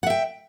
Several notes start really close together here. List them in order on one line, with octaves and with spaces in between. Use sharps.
F#5 E5 G5